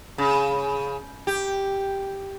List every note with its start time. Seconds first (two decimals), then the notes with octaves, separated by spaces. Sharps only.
0.18 C#3
1.27 G4